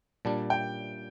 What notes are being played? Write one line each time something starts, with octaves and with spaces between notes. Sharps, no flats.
A#2 G3 D4 A5
G5